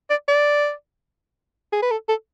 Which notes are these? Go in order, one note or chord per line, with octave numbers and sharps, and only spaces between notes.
D5
D5
G#4
B4
A4
A4